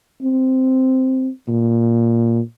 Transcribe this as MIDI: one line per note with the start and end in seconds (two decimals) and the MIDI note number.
0.23 1.29 60
1.48 2.40 46